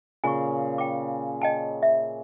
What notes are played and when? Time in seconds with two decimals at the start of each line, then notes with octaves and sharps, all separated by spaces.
0.24 A#2 C#3 G#5 C#6
0.78 G5 D6
1.42 D#5 G5 A5
1.83 E5